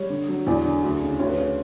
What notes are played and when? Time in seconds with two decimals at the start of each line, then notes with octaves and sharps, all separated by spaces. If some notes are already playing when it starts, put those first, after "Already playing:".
Already playing: G3 C#5
0.10 D3
0.29 F#3
0.47 E2 D5
0.65 D3
0.84 D2
1.02 C#3
1.19 D2 C#5
1.27 B4
1.35 C#3 C#5